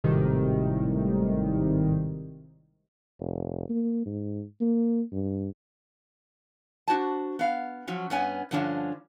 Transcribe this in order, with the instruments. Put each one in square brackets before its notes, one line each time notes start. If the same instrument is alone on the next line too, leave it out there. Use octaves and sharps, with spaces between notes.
[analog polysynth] G#1 A2 C3 D#3 G3
[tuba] F1
A#3
G#2
A#3
G2
[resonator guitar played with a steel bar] D4 F#4 C5 A5
B3 F5
F3 F#3 C#4
G2 B3 C#4 G#5
G2 D3 F3 C#4 D4 F5